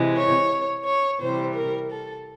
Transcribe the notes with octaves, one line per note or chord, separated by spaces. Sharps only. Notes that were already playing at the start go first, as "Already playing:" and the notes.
Already playing: C3 E3 G#3
C#5
C#5
C3 E3 G3 C5
A#4
A4